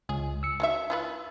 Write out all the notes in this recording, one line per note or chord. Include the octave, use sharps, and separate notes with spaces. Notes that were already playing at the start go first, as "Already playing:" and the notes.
C#2 G#4
E6 C#7
F#3 D#4 E5
E4 F4 B4